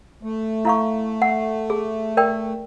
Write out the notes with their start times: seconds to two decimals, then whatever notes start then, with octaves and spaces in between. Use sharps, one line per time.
0.23 A3
0.65 E4 F5 C#6
1.22 F#5
1.70 G#4
2.17 A#4 D5 G5